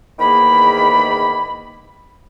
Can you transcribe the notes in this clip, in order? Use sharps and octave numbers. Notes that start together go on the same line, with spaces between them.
E2 G#2 D#3 A#3 B5